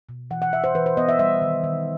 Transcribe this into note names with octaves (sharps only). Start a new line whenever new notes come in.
B2
E3 F#5
F#5
E3 E5
C5
E3 B4
C5
B3 D#5
E5
G3 E5
D#3
D#3